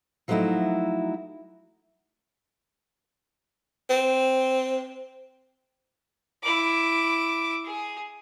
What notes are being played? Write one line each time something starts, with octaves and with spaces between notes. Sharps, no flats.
F3 F#3 A3 D#4 E4 F#4
C4
E4 D6
G#4